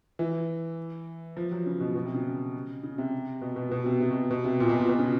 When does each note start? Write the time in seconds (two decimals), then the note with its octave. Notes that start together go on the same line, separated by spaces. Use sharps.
0.19 E3
1.37 F3
1.51 F#3
1.66 C#3
1.80 B2
1.96 B2
2.05 C3
2.14 C#3
2.84 C#3
2.98 C3
3.42 B2
3.56 B2
3.71 B2
3.86 C3
4.00 C3
4.11 B2
4.31 B2
4.44 C3
4.60 A#2
4.69 B2
4.80 A#2
4.89 B2
4.99 C#3